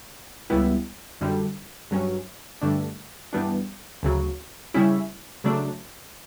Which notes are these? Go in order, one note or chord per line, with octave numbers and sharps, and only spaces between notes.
C#2 C#3 G3 B3 E4
F#2 D3 G3
G2 F#3 C#4
G2 D3 A3 D4
G2 E3 G3 B3 D4
D2 C#3 F#3
C#3 G3 C#4 E4
C#3 F#3 A3 D4